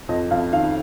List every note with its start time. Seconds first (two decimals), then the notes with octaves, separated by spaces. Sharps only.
0.09 F2 D#5
0.31 F2 F5
0.53 D#3 F5